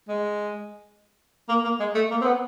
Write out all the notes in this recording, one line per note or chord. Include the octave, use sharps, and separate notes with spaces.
G#3
A#3
A#3
G#3
A3
A#3
C4
B3